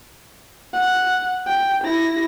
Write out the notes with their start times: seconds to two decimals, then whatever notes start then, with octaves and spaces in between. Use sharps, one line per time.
0.74 F#5
1.47 G5
1.84 E4 A#6